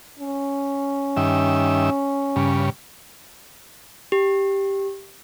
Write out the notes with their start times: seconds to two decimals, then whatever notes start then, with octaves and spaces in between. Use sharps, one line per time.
0.20 C#4
1.17 G2 D#3 E5
2.36 G2 C#3
4.12 G4